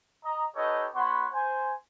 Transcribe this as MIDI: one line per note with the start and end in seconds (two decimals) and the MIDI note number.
0.24 0.44 75
0.24 0.44 82
0.55 0.86 63
0.55 0.86 67
0.55 0.86 69
0.55 0.86 71
0.55 0.86 73
0.55 0.86 75
0.95 1.27 59
0.95 1.27 66
0.95 1.27 73
0.95 1.27 78
0.95 1.27 83
0.95 1.27 84
1.33 1.74 72
1.33 1.74 80